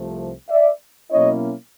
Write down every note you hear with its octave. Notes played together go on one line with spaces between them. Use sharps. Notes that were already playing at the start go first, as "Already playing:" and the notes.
Already playing: C2 C3 F3 A3
D5 E5
B2 F#3 A#3 C#4 E4 C#5 D#5